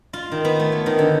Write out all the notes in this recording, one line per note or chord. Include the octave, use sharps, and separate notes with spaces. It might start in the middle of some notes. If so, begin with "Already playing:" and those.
F4
D#3
B3
A3
C#5
D#3
D3